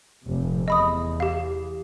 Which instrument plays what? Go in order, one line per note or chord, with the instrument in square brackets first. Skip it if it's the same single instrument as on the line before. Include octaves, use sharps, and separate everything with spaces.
[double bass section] F1 C3
[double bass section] E2 [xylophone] D#5 B5 D#6
[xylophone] G4 F5